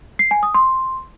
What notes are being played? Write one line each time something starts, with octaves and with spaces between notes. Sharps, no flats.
C7
G#5
D#6
C6